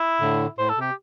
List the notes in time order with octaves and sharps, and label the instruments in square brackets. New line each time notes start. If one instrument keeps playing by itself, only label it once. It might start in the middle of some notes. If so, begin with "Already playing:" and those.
Already playing: [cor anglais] E4
[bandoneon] A2 D3
[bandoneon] A2 [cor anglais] C5
[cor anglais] A4
[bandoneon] C3 [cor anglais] G4